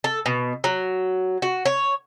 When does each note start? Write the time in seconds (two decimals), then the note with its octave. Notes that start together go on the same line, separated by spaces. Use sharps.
0.04 A4
0.26 B2
0.64 F#3
1.42 F#4
1.65 C#5